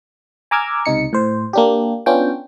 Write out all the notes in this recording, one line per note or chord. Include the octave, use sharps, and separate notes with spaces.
G#5 A#5 D6 E6 F6 G#6
C#2 C3 D#4 C#7
A2 C5
A#3 D4 G4
B3 C#4 D4 F4 G5